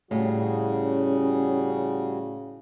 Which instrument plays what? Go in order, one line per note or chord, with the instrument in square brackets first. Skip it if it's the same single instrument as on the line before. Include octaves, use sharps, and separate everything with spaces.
[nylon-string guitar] A2 [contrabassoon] C#3 [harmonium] G3 F#4 G#4 [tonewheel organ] C#4